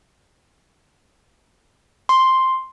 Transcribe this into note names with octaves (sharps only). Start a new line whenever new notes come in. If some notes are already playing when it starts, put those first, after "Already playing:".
C6